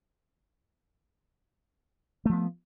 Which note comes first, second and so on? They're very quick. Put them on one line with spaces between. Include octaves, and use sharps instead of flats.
A3 F3 B3